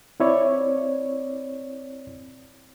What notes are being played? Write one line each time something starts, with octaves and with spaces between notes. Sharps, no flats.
C4 E4 C#5 D5